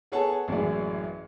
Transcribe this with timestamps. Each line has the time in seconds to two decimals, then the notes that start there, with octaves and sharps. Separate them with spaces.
0.12 B3 G#4 A4 C#5 F#5 A5
0.48 A1 F#2 G#3 E4 G#4 D5